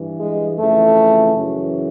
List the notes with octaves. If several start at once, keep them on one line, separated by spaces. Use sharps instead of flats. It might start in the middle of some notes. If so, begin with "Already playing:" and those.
Already playing: G2 E3
G#3
F2 C#3 E3 A3
F#2 C#3 E3